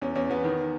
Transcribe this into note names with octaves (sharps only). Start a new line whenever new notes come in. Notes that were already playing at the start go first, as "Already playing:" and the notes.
E2 C#4
E2 C#4
E2 B3
D#3